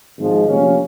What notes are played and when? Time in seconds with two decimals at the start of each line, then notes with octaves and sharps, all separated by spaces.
0.18 G#1 G#2 F3 G#3
0.47 D2 C3 F3 A#3 C#4